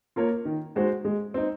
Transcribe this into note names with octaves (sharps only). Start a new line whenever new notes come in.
A#3 F4 A#4 C#5
D#3
G#3 D#4 F#4 C5
G#3
C4 D#4